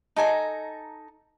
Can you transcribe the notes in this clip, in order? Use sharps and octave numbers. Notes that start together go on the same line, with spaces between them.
D#4 A4 G#5 A#5